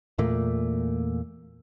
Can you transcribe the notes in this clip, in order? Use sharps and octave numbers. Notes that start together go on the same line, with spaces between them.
E2 A#2 A3 A#3